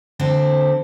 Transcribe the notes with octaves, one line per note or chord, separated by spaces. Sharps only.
D3 C4 E4